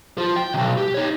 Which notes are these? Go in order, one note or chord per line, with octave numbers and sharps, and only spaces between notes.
F4 C5
G5
B1 C3
G4
D#4 C#5